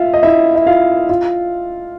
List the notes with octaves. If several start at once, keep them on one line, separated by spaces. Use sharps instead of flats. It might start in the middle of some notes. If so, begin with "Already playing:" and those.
Already playing: F4 E5 F5
D#5
E4 E5
E5
F4 F5
F4 F5